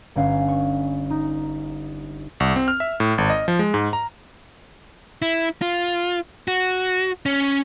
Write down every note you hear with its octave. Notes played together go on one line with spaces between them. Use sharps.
G1 C#4 F5
C#6
D#4
C2
C4
F6
E5
A2
G#1
D#5
F3
G#3
G#2
A#5
E4
F4
F#4
C#4